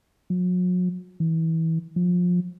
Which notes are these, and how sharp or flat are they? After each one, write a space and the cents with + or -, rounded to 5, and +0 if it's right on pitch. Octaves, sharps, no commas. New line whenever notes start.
F#3 -40
E3 -25
F3 +25